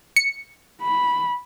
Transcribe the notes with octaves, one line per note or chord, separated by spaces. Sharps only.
C#7
B5